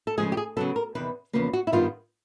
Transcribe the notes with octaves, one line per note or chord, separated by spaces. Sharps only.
A4
C#3 F3 G#3 G#4
G4
G#4
C#3 F#3 B3 A4
A#4
E2 C3 D#3 B4
E2 C#3 F3 A#3 B4
F#4
E4
G2 D#3 G3 B3 F4